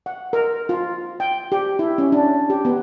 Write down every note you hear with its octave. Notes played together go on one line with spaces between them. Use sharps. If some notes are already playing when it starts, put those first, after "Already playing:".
F#5
A#4
F4
G5
G4
E4
C#4
D4
G4
B3